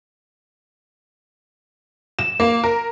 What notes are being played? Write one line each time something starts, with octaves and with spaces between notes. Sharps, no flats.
E7
A#3
A#4